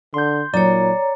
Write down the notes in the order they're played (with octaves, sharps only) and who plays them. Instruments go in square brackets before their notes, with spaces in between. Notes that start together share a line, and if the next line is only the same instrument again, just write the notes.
[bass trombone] D3 [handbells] C6 G6
[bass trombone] A#2 [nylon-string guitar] F#3 D#4 [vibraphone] C#5 A#5 [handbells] D5